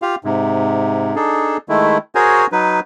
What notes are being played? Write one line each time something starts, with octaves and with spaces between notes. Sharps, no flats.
F4 G4 F5
G#2 C3
D4 D#4 G#4 A4
D#3 G#3 A3 E4
F#4 G#4 A#4 C5 C#5 G#5
F#3 D#4 B4